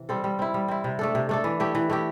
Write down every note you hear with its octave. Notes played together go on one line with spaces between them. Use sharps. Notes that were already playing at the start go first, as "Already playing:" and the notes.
Already playing: C3 E3
G3 C4 A4
G3
C4 E4
G3
C4 E4
C3
A3 D4 A4
C3
A3 D4 A4
E3
A3 E4 G4
E3
A3 E4 G4